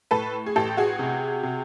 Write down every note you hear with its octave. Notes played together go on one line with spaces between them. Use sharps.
A2 A4 B4
G#4
A1 G4 A4
F#4 G#4
C3
C3